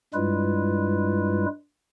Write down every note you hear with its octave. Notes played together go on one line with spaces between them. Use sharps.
G2 G3 G#3 E4 F4 B4